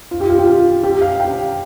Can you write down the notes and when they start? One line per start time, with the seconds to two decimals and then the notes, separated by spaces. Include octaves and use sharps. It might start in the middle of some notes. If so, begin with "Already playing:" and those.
0.11 F4
0.20 G4
0.29 F4
0.38 G4
0.47 F4
0.84 G4
1.01 F5
1.20 G5